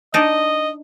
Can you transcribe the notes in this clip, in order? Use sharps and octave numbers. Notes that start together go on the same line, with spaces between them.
D4 D#4 D#5